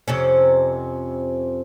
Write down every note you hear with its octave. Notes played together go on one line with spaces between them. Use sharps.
F2 C3 C#4